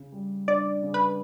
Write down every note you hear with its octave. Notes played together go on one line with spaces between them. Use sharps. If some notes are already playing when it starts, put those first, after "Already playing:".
Already playing: C#3
G3
D4 D5
C#3
B4